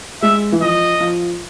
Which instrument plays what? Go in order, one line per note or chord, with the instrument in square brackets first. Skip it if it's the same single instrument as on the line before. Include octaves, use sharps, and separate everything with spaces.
[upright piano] G#3 [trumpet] E5
[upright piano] E3
[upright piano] F3 [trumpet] D#5
[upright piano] F3